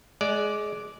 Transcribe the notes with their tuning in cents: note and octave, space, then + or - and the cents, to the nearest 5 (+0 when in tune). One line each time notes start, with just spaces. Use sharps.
G#3 +15 D5 -5